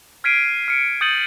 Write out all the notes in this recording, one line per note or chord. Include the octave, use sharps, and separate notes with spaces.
F6 G#6 B6 C7 D7 D#7
F6 C#7 D7
D#6 G6 A6 C#7 D#7 F#7